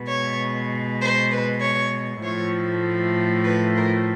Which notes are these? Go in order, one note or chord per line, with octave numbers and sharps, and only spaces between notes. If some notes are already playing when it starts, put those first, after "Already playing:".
Already playing: B2 G#3 B3
C#5
C5
B4
C#5
A2 F3 A3 C#5
B4
A#4